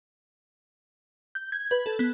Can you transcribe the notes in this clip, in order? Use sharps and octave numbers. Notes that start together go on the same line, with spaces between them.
G6
G#6
B4
A4
B3